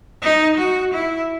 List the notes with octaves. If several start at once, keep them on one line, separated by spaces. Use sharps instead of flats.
D#4
F#4
E4